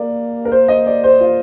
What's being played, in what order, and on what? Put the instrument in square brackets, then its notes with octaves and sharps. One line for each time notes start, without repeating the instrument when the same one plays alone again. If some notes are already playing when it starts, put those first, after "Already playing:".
Already playing: [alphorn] A#3 [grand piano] D5
[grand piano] A#4
C5
D#5
D5
C5
F4